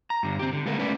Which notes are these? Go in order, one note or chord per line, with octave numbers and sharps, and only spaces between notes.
A#5
G2 D3
C4 G4
D3
G#3 A3 B3 A4 A#4
A3 C#4 B4 D5